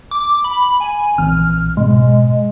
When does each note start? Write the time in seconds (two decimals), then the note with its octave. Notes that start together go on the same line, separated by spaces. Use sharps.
0.11 D6
0.44 B5
0.80 G#5
1.18 A#1 E3 C4 F6
1.77 G#2 B2 G#3